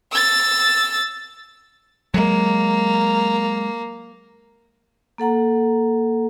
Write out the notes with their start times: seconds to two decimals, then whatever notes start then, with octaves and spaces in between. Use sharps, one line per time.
0.12 E6 A6
2.14 F#3 G#3 A#3
5.18 A#3 A4 F#5 A#5